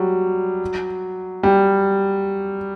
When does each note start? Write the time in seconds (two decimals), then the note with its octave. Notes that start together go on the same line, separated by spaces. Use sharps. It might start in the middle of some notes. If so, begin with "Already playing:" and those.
Already playing: F#3 G3
1.43 G3